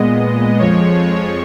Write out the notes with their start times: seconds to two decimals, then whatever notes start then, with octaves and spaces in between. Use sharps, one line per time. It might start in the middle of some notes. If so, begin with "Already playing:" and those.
Already playing: A#2 G#3 B3 D#5
0.59 F2 F3 G#3 C#5